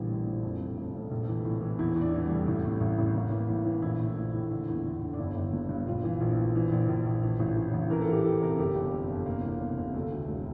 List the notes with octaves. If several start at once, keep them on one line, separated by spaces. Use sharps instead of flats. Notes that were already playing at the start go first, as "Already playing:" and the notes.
Already playing: A#1 D3 E3 G3
A2
A2
F2
F1
F1
F1
A#1
E3
A2
E3
E2 E4
E2
D4
E3
G3
F1
A1
A2
A1
A1
A1 A#3
E3
A2
E3
A#1 E4
A2
A2
A2
D3
E2
D3
D3
D4
G1 E4
G1
G2
G2
A#1 F4
E3
A#1
E3
E3
A#1
A#1
A#1
E3
A1
E3
A1
E3 A#4
A4
E3
G4
E3 A4
C3 A#4
A4
G1 G4
G1
F2
G1
C3 A#3
E2
C3
C3
D2 A3
D2
E1